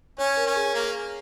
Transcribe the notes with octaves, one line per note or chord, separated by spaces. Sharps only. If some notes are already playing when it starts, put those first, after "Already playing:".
C#4 C#5
A#4
C#4
G#4
A#3